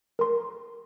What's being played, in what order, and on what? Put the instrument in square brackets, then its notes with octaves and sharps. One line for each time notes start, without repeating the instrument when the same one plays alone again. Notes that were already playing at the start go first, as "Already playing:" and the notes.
[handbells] A#4 C6